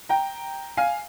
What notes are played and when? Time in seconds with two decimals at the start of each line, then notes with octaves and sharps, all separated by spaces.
0.09 G5 A#5
0.77 F5 G#5